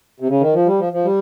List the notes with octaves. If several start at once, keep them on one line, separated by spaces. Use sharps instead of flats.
C3
C#3
D#3
F3
G3
F3
F3
G3